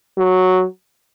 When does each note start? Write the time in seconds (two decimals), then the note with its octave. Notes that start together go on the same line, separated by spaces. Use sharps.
0.18 F#3